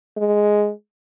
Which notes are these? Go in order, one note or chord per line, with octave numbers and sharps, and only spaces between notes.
G#3